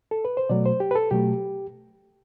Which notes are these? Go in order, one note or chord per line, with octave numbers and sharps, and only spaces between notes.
A4
B4
C5
B2 F#3 A3 D5
C5
G4
B4
A4
B2 F#3 A3 G4